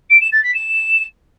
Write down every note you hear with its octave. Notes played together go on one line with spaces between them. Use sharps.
D7
E7
A6
B6
E7